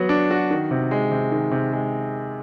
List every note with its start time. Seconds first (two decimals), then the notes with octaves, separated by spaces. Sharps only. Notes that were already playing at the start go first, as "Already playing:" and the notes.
Already playing: F#3 B3 F#4
0.09 D4
0.31 F#4
0.51 D#3
0.71 C3
0.91 G#3
1.11 C3
1.32 D#3
1.51 C3
1.73 G#3